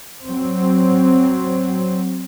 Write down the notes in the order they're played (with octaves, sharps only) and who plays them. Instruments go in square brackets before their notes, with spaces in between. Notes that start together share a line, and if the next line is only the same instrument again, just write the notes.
[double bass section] F#3 C4